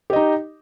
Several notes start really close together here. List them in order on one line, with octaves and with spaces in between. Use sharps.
G4 D#5 D#4